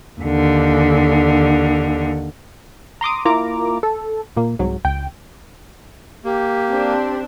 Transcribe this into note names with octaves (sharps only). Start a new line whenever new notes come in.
D#2 D3
A#5 C6 D6 D#6
A#3 E4 F4 A#5 D6
A4
A#2 A#3
C2 G#2 F#3
C#2 G5
A#3 G4
C4 D4